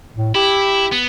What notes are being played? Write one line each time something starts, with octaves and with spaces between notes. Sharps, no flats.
A2
E4 G4
B3